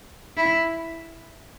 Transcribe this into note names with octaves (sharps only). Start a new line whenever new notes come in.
E4